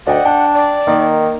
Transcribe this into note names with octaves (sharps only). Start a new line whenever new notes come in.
D2 D5 D#5 F#5 G5
D4 G5
D5
D#3 A#3 D#4